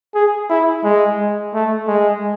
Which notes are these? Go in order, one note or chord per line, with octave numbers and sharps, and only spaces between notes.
G#4
E4
G#3
A3
G#3